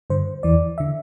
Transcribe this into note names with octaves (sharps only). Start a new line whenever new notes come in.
G2 D3 C5
E2 E3 D5
D3 E5